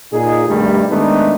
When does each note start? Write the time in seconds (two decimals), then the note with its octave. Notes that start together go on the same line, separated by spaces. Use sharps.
0.13 A#2 D#4 G#4
0.49 G2 B2 D#3 G3 A3
0.90 D#3 G#3 A3 B3 D4 D#4